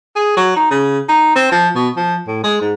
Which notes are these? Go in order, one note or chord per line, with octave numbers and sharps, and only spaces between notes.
G#4
F#3
D#4
C#3
D#4
C4
F3
B2
F3
A2
G#3
G#2